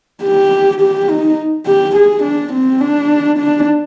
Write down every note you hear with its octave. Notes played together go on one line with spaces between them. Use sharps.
G4
G4
D#4
G4
G#4
D4
C4
D4
D4